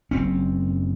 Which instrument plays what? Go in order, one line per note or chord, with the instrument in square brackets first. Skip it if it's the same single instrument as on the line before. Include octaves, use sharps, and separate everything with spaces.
[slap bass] F#1 C4 C#4